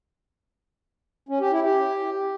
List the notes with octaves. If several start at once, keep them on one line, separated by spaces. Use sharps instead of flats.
C#4
G4
E4
G4